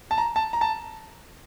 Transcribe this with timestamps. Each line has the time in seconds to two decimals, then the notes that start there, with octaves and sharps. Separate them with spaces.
0.11 A5
0.18 A#5
0.36 A5
0.53 A#5
0.61 A5